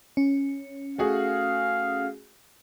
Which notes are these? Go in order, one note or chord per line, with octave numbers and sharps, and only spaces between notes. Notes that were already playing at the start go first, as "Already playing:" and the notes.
C#4
A3 F#4 G#4 F5